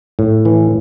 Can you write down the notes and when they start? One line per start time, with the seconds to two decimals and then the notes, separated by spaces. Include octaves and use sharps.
0.19 A2
0.45 E3